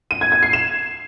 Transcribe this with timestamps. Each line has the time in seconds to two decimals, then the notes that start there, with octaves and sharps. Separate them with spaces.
0.11 D#7
0.21 G#6
0.32 G#6
0.43 C7
0.53 E7